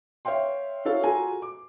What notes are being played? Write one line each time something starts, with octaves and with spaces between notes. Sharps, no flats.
C#5 E5 F5 G5 C6
E4 F#4 A4 C#5 F5
F4 F#4 G#4 A4 G#5 A#5
D6